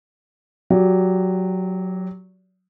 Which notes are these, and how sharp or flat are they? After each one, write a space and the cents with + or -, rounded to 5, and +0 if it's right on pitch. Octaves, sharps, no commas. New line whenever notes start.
F#3 -5 G4 +0 D5 -40